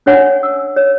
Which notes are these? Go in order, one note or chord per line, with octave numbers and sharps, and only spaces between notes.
C#4 D4 C#5 F#5 G#5
E6
C#5